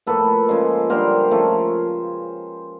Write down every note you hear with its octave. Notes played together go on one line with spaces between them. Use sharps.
A2 F3 A#3 A4 B4
C#3 F3 G#3
D3 G3 A#3 A#4 C5
C#3 F3 A3